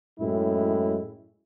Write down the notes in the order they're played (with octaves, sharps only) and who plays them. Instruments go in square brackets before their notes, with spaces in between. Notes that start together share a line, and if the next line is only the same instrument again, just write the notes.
[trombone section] F#2 A2 G#3 E4